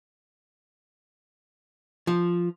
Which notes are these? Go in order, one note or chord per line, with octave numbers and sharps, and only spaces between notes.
F3